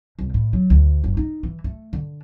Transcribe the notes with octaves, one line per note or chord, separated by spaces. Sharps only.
C2
A2
F#3
D2
F#1
D#4
E3
A3
D3